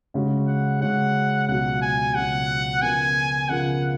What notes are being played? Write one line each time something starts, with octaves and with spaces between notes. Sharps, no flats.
C#3 G#3 C#4 F#4
F#5
C#3 G#3 C#4 F#4 F#5
C#2 B2 F#3 F#5
G#5
C#2 B2 F#3 F#5
C#3 F3 B3 F4 A#4 G#5
C#3 F3 B3 F4 A#4 F#5